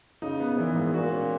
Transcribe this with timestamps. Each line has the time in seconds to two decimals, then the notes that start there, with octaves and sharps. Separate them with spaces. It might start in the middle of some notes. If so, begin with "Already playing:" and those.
0.22 C#3 D#4
0.40 B3
0.58 A#2 E3
0.76 G#2
0.94 A#2 F#4
1.12 C#4